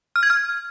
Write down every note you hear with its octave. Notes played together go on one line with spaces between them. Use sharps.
F6
G#6
F6